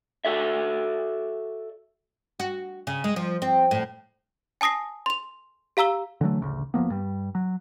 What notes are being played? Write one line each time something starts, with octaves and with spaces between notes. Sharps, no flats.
F#4 A4 D5 E5
F#4
C#3
G#3
F3
C4
A2
G#5 A5 D#6 A#6 C7
C6 F7
G4 F5 A#5 E6 G7
D3 E3 F#3 A3
A1 D2 C#3
F1 F3 A#3 B3
G2 G3
F#3